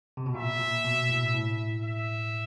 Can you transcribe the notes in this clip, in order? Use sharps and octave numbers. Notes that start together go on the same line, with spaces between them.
C3
B2
A#2 E5
A#2
B2
A2
A2
E5